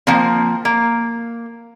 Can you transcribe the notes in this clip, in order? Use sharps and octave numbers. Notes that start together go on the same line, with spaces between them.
F3 A#3 C4
A#3